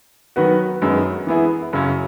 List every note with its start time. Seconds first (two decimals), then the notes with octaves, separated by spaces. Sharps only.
0.36 D#3 F#3 B3 F#4 B4
0.82 F#2 D#3 G#3 B3 F#4
1.27 E3 B3 E4 G#4
1.73 F#2 C#3 F#3 C#4